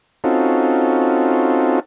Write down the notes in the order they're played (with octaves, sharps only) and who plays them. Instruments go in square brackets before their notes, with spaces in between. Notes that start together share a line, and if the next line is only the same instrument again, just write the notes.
[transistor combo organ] C4 C#4 D#4 F4 F#4 A4